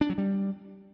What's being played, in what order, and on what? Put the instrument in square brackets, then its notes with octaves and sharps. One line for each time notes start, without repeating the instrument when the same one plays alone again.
[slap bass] D4
F#3
G3